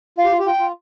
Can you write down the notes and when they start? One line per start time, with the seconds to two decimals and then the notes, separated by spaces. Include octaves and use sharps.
0.18 F4 F5
0.25 G4
0.32 F4
0.39 G4
0.46 F4 G5
0.59 F4